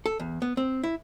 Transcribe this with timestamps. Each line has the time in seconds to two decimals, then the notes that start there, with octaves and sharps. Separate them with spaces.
0.06 A4
0.20 E2
0.42 B3
0.57 C4
0.84 E4